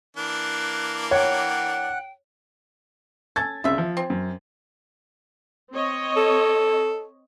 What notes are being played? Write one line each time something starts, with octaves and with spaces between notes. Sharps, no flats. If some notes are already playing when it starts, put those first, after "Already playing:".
E3 A#3 D4 F#6
C#5 F#5 G5
C#4 A4 G#6 A6
C2 C#3 F4 E5
F3
C4
F#2
C4 C#5 D#5
A4